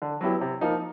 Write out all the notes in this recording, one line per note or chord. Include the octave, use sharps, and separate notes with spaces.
D3
F#3 B3 E4 G4
C3
F3 A#3 D#4